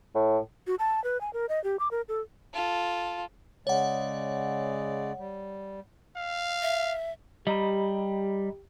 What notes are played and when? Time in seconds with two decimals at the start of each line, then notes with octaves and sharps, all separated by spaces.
0.15 A2
0.67 F#4
0.79 A5
1.04 B4
1.21 G#5
1.33 A#4
1.49 D#5
1.64 G4
1.79 D6
1.91 A#4
2.09 A4
2.53 F4 A4
3.67 C#3 G#3 C#5 D5 F#5
5.18 G3
6.17 F5
6.62 E5
7.47 G3 G4 D#5 A#5 B5